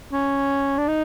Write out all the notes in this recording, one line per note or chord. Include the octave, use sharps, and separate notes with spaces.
C#4
D4
D#4